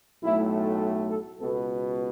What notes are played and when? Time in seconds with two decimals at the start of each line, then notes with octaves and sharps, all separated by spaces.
0.23 B1 A2 A3 E4
1.10 A4
1.39 C#2 B2 B3 A4